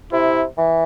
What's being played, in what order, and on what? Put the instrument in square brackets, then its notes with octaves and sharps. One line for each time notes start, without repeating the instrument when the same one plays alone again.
[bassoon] C3 [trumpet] E4
[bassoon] E3